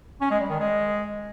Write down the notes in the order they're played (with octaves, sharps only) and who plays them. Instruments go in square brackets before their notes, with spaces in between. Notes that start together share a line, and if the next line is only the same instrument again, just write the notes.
[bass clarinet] C#4
G#3
G3
D#3
G#3